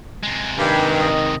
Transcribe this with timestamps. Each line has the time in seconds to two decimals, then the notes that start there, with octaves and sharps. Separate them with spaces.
0.23 C3 G#3
0.59 G2 D#3 G4
1.00 D#5